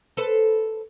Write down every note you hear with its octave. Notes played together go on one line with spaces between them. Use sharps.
A4 B4 C5